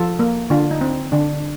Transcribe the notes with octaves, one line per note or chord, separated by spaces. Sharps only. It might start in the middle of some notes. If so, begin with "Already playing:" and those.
Already playing: F3 F4 A4
A#3
D3 D4 F4
D#4
C4
D3 D4